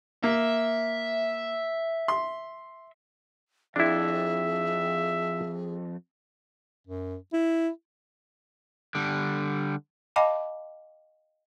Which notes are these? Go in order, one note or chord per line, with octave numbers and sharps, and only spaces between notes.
A#3 E5
C6
F2 D4 E4 G#4 E5
F#2
E4
D3 G3
D#5 F5 G5 A5 B5 D6